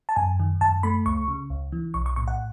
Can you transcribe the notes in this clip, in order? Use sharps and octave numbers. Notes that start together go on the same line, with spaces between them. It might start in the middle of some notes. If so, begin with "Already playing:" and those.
A5
F#2 G#5
D#3
F#2 A5
A3 B5
C#2 C#6
C#3
C#2
E3
B1 C#6
C#6
A2 C#6
F#5